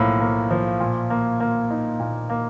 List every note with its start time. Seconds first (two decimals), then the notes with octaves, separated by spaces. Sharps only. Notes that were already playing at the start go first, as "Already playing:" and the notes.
Already playing: B1 A2 F3 A#3
0.21 A#3
0.51 F3
0.80 A#2
1.10 A#3
1.40 A#3
1.70 D#4
2.00 A#2
2.30 A#3